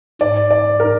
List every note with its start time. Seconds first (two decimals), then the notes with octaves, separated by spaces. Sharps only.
0.21 G#2 D5
0.51 D5
0.80 A#4